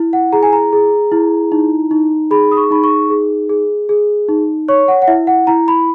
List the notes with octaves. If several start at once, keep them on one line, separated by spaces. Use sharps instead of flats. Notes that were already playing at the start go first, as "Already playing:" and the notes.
Already playing: E4
F#5
G#4 A#5
G#5
A#5
G#4
E4
D#4
D#4
G#4 B5
D#6
C#6
D#4 B5
C#6
G#4
G#4
G#4
D#4
C#5 C#6
F#5
F#5
E4 E5
F#5
E4 A#5
B5